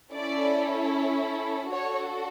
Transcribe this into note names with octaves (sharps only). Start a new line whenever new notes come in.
C#4 E4 A4 D5
D4 F#4 A4 C#5